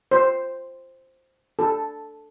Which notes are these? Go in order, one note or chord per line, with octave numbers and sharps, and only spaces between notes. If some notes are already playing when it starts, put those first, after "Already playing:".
C5
A4